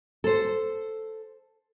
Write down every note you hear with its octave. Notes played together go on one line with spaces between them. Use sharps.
A4 C5